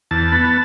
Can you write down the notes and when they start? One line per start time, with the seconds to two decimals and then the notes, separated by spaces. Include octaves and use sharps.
0.11 E2 A5
0.32 B3